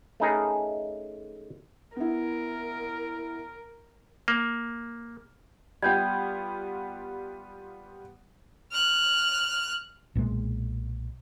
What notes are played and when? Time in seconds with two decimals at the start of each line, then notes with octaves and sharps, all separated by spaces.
0.20 A3 C#4 D#4 G#4 A#4 B4
1.96 B3 E4 A#4
4.28 A#3
5.82 G3 B3 F4 G5 G6 G#6
8.72 F6 F#6
10.15 B1 A#2 E3 G#3